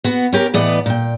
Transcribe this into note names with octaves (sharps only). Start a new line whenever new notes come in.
B3 F#4
C#4 G4 A#4
A2 E3 B3 B4 D5 D#5
A#2 G5